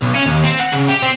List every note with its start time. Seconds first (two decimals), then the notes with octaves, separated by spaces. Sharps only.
0.02 B1
0.14 C#4
0.26 D#2
0.44 C4
0.59 F#5
0.72 C#3
0.88 G4
1.02 C4